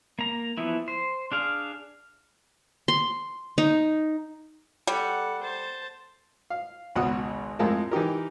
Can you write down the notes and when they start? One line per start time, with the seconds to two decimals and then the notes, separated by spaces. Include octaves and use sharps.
0.19 A#3 A#5
0.57 E3 F3 B3 E4
0.88 C5
1.32 D4 G#4 F5
2.88 C6
3.58 D#4
4.87 G3 A4 F#5
5.42 C5 A5
6.50 F5
6.95 G#1 C#2 B2 G#3 F#5 D#6
7.59 F2 A2 G#3 F4 A#4 A5
7.91 E3 D#4 G4 A#4